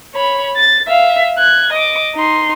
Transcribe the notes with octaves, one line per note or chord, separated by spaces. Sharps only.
C#5 B5
A6
E5 F5
F#6 G#6
D#5 D6
D#4 C6